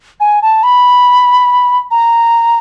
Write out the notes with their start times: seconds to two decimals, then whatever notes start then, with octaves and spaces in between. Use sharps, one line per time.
0.20 G#5
0.42 A5
0.63 B5
1.91 A#5